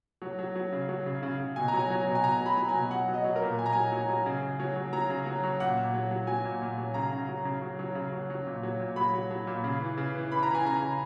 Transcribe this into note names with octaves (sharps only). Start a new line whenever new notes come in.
F#3
F#3
F#3
C#3
F#3
C#3
C#3
C#3
B2 G#5
A#5
F#3
G#5
F#3
B2
G#5
B2 A#5
F#3 B5
F#3
G#5
B2
F#3 F#5
F#3
D#5
F#3
A#4
A#2
A#2 G#5
A#5
F#3 G#5
F#3
F#3
C#3
C#3
F#3
F#3
F#3 A#5
C#3
F#3
F#3
A#2 F#5
A#2
F#3
F#3
F#3 G#5
A#2
A#2
F#3
C#3 A#5
C#3
F#3
C#3
F#3
F#3
C#3
F#3
F#3
A#2
F#3
A#2
F#3 B5
F#3
F#3
A#2
C#3
E3
C#3
E3
E3 B5
A#5
E3
G#5
C#3 A#5
C#3